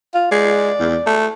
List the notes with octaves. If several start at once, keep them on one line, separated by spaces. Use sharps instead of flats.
F4
G#3 D5
E2
A3